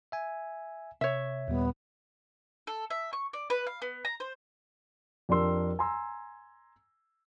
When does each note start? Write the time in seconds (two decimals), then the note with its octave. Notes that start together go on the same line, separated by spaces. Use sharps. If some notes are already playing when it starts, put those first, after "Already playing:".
0.12 E5 G#5
1.01 C3 C#5 E5
1.48 D#2 A#2 G3 B3
2.67 A4
2.90 E5
3.13 C#6
3.33 D5
3.50 B4
3.67 F5
3.82 B3
4.05 A#5
4.20 C5
5.29 F2 D4 G4 A#4 C6 E6
5.79 G#5 A#5 C6 E6